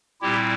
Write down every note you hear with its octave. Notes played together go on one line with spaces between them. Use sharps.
A#2 G3 C4 E4 G4